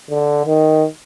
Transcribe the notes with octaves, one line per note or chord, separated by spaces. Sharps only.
D3
D#3